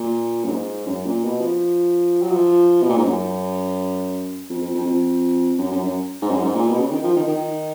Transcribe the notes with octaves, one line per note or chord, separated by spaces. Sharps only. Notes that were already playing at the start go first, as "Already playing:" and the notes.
Already playing: A#2
F#2
G#2
F#2
A#2
B2
F3
F#3
F3
B2
A#2
G#2
F#2
F2
F2
F2
F2
F#2
F#2
F#2
G#2
F#2
G#2
A#2
B2
C#3
D#3
F3
D#3
D#3